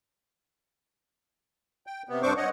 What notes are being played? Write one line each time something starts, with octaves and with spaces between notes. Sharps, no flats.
G5
C3 B3
G2 C4 D4 C5 C#6 D6
C#5 D#5 F#5